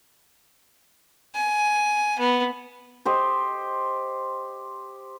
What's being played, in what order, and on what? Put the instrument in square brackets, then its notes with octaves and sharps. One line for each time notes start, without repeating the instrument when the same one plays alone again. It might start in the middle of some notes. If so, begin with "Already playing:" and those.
[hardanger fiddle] G#5
B3
[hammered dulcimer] G4 C5 D#5